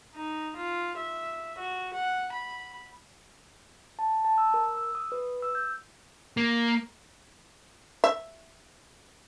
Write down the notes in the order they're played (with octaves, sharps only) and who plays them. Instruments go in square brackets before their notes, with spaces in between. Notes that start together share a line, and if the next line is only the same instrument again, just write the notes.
[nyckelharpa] D#4
F4
E5
F#4
F#5
B5
[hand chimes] A5
A5
E6
A#4
E6
D#6
B4
E6
G6
[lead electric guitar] A#3
[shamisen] E5